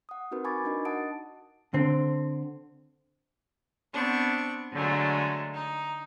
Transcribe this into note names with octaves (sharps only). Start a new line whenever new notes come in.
F#5 D#6
C4 D#4 F#4 A#4 B4
G#5 B5 C#6 D6 G#6 A6
D4 D#4 F#4 A#4 D#5
D#5 F#5 A5 D#6 A6 D7
D3 C4
B3 C4 D4 C#6
D3 F#3 G#3 A3
D#4